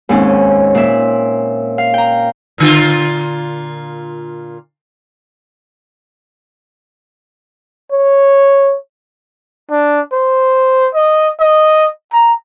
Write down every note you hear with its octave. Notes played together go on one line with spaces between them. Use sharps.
D#2 G#2 C4 C#4
A#2 E5
F5
G5 A#5
A#2 D3 F4
C#5
D4
C5
D#5
D#5
A#5